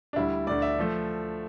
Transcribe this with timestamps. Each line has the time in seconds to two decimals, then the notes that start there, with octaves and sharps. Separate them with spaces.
0.13 D4
0.16 D2 D3 G3 E4
0.47 D2 D3 A3 D5
0.62 E5
0.79 F3 A3